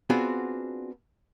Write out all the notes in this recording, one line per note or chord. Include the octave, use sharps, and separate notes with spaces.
B3 C4 D4 F4 F#4 G#4